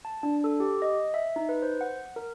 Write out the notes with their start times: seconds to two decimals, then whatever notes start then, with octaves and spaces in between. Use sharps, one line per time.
0.05 A5
0.23 D4
0.44 A4
0.60 G4
0.82 D#5
1.14 E5
1.36 D#4
1.49 B4
1.62 C5
1.81 F#5
2.16 A#4